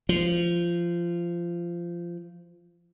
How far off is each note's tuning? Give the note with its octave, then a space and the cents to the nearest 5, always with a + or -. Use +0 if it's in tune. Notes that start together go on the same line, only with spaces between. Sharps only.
F3 -20